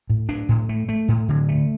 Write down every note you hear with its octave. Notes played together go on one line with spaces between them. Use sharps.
A2
D4
A2
A3
A3
A2
D3
A3